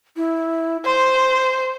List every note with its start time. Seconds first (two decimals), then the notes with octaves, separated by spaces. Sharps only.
0.17 E4
0.85 C5 C6